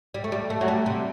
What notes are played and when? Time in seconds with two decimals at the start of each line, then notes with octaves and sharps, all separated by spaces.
0.14 G3
0.24 A3
0.32 G3
0.50 A3
0.61 F#3
0.68 G3
0.86 C3